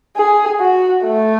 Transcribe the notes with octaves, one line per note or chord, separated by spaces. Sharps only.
G#4
F#4
A3